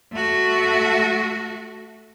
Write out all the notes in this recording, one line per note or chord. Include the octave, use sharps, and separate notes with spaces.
A3 F#4